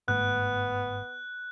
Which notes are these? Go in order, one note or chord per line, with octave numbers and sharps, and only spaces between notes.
G1 G#2 A3 B3 F#6